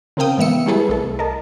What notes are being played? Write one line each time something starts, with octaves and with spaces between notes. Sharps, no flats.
C#3 C4 A#4 F5 G5 D#6
G#2 E3 B3 E5 E6 C#7
G3 A3 E4 G#4 A4 B4
C2 A4
A#4 D#5 A5